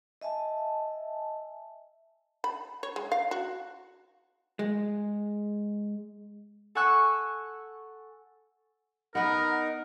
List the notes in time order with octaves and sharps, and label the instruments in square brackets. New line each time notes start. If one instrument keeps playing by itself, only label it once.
[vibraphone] D#5 E5 G#5 A5
[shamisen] B5
C#5
G#3
F5
F#4
[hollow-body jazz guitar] G#3
[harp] A4 F#5 G#5 C#6 E6 F#6
[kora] B3 B4 [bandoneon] D#4 [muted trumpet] A#4